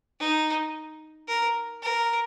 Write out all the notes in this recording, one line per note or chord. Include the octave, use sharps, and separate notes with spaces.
D#4
A#4
A#4